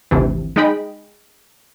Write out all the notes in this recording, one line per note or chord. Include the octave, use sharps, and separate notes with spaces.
G#1 D2 C3 E3
G#3 D#4 D#5 G5 B5